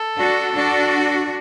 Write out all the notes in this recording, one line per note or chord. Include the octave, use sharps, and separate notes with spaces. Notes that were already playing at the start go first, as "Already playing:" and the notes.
Already playing: A4
D4 F#4
D4 F#4